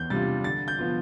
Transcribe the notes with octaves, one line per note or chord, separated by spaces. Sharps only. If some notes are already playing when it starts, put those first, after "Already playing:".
Already playing: E2 G6
C3 G3 D4 F4 A6
D3 A6
G6
F3 B3 F4